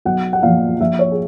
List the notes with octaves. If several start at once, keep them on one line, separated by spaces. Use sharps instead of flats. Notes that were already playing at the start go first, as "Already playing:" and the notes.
B1 F#5
F#5
A#2 F3 F5
A#1 E5
C#5
G#4